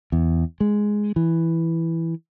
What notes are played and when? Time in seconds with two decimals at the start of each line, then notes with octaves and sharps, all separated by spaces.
0.12 E2
0.60 G#3
1.16 E3